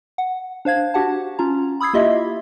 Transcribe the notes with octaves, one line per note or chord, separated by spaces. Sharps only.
F#5
D4 C5 F5 G#6
D4 F#4 G4 F#5 A5
C#4 F4 A#5
B5 D#6 E6 G#6 C7
A#3 E4 F4 G4 D#5 E5